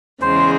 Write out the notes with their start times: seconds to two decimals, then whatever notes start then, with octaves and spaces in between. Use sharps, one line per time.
0.22 E2 C#3 G#3 C5